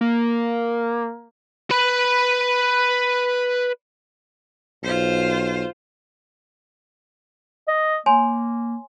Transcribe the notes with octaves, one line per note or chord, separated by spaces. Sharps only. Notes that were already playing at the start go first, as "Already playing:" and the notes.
A#3
B4 B5
B1 F4 C5
D#5
A#3 C#5 G#5 C6